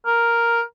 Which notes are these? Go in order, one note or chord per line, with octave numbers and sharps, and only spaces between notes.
A#4